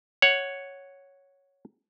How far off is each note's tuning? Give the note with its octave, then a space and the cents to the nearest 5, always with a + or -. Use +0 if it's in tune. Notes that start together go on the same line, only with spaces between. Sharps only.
C#5 +0 F#5 +0